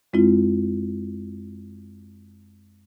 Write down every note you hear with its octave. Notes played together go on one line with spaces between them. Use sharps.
F#2 G#3 C4 E4 F4